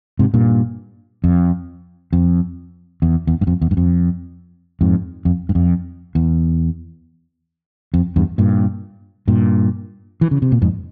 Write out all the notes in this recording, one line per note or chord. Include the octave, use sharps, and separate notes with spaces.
G#2 C3
G2 A#2
F2
F2
E2
E2
G2
F2
E2
G2
F2
F2 G#2
F2
G2
F2
E2
F2
E2 G2
G2 A#2
G2 A#2
E3
C#3
C3
A#2
F2 G#2